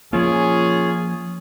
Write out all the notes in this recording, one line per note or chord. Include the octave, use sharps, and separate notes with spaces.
F3 A#3 C#4 F4 G#4